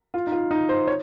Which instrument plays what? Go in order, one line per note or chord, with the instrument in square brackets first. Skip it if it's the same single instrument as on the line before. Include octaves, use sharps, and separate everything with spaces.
[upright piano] F4
D#4
F4
D#4
C5
C#5